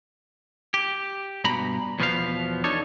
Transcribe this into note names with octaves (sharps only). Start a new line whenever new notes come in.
G4
G2 B2 A#5 B5
E2 B2 F3 B3 C5 F5
D4 D#4 A4 C#5